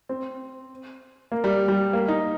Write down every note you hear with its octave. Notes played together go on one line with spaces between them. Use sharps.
C4
A#3
G3
G3
A#3
D#4